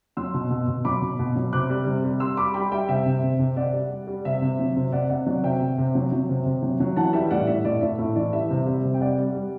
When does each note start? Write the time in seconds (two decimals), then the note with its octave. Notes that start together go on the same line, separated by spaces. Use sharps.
0.17 F#3 C6 E6
0.34 B2
0.50 B2
0.68 B2
0.85 F#3 B5 D6
1.01 B2
1.19 B2
1.36 F#3
1.52 C3 D6 F#6
1.70 G3
1.86 C3
2.04 G3
2.20 G3 C6 E6
2.37 G3 B5 D6
2.54 G3 G5 B5
2.71 G3 E5 G5
2.89 C3 E5 G5
3.06 C3
3.23 C3
3.39 C3
3.56 C3 D5 F#5
3.73 G3
3.90 G3
4.07 G3
4.25 C3 E5
4.42 C3
4.59 F#3
4.76 C3
4.92 C3 D5 F#5
5.10 C3 D5 F#5
5.26 F#3 D5 F#5
5.44 C3 E5 G5
5.60 C3
5.78 C3
5.95 F#3
6.12 F#3
6.29 C3
6.46 C3
6.62 F#3
6.80 F#3
6.96 E3 F#5 A5
7.13 G3 E5 G5
7.30 A2 D5 F#5
7.47 A2 E5
7.65 A2 D5
7.81 A2 E5
7.99 A2 E5
8.16 E3 D5
8.33 G3 E5
8.50 C3
8.66 G3 E5
8.83 C3
8.94 G5
9.01 G3 D5 F#5
9.18 G3
9.35 G3